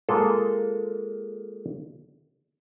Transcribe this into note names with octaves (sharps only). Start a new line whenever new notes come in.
G#3 A#3 F4 A4